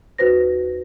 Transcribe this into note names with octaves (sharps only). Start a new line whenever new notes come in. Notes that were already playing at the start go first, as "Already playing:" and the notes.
D#2 F#4 B4 C5 A#6